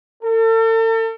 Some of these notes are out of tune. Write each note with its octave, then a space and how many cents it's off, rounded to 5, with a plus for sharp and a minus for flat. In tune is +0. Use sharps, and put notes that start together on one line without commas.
A4 +40